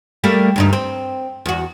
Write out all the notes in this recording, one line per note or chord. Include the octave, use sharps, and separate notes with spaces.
G3 A3 A#3
D2 G2 D#4
C4
E2 F#4